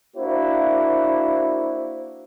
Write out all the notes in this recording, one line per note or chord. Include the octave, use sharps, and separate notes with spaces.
A#3 D4 E4 F#4 C5